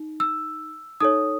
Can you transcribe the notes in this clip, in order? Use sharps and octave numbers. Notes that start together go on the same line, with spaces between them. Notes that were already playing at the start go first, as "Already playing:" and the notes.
Already playing: D#4
E6
D#4 A4 C#5 D#6